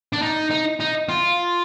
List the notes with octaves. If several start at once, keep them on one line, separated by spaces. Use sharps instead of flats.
D4
D#4
D#4
D#4
F4